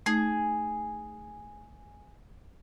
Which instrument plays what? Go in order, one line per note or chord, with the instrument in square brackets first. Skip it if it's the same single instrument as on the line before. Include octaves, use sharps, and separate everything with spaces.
[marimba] A3 D#4 [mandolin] G#4